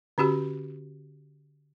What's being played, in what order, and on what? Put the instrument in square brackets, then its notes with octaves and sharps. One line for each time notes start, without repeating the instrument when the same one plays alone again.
[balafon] D3 C#4 F#4 G4